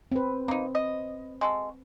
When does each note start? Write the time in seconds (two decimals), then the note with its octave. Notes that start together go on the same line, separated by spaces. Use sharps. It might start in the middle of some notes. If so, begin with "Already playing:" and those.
0.12 C4 B4
0.48 A#3 C4 D#4
0.75 D#5
1.41 G#3 F#4 A4